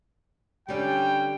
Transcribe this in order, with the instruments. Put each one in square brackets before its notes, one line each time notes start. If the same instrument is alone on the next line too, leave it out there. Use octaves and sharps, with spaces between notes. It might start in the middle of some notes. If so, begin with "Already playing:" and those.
[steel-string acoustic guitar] D3 G4 [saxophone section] G3 C#4 [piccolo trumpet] G5